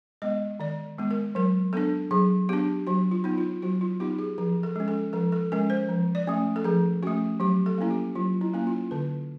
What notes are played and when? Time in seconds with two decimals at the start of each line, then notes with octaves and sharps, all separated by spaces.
0.22 G#3 B3 D#5
0.60 D#3 D5
0.98 G#3 B3
1.11 A#4
1.35 F#3 A#4
1.73 B3 D4 A4
2.11 F#3 G#4
2.49 B3 D4 G4
2.87 F#3 F#4
3.11 F4
3.24 B3 D#4
3.38 F4
3.62 F#3 F#4
3.81 F4
4.00 B3 D#4 G4
4.19 G#4
4.38 F3 G#4
4.63 A4
4.76 G#3 C#4
4.88 A4
5.13 F3 A4
5.32 A4
5.52 G#3 C#4 A#4
5.70 C5
5.89 F3
6.15 D5
6.27 A3 C#4
6.56 A4
6.64 F3 G#4
7.03 A3 C#4 F#4
7.40 F#3 G4
7.66 A4
7.78 A#3 C#4 E4
7.90 G4
8.15 F#3 F4
8.41 E4
8.53 A#3 C#4 E4
8.67 F4
8.91 D3 B4